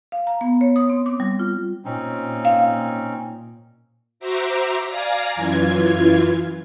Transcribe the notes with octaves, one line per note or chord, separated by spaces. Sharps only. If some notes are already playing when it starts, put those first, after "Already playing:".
F5
A#5
B3
C#5
D#6
C4
D6
G3
F4
A#2 C4 C#4 D#4
F5
F#4 C5 E5 A#5 D6
D5 F5 G#5 A#5 A#6
F#2 E3 F4 G#6